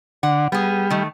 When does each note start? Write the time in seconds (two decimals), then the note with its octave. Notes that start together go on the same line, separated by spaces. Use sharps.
0.23 D3 F#5
0.52 G3 B3 G#4
0.90 D#3 A3